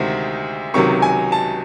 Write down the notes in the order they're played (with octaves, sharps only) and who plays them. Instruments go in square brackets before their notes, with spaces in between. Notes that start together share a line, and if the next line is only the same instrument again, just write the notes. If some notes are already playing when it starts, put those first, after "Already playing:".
Already playing: [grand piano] D2 C3 D#3 G#3 C4
C#2 C3 D#3 F#3 C#6
G#5
A5